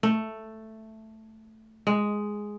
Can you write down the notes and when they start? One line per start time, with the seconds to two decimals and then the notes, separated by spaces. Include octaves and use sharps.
0.03 A3
1.87 G#3